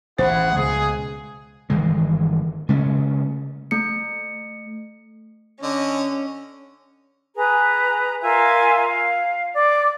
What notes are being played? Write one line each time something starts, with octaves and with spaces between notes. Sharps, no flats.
A1 E4 G#4 C5 F#5
C#2 B2 G#4
G1 D#3 E3 G#3
C#3 G#3 A3 C#4
A3 C#7
D3 C#4 D#5
G#4 B4 A#5
F4 A#4 E5 G#5
F5
D5